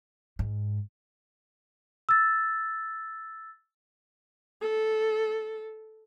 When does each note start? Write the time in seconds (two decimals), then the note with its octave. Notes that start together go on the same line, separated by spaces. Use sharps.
0.39 G#2
2.09 E6 A6
4.62 A4